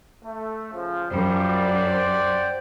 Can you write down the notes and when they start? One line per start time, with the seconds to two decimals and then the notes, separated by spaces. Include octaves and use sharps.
0.23 A3
0.74 C#3 F3
1.10 F#2 F3 G3
1.48 G4 D5 F#5
1.88 C5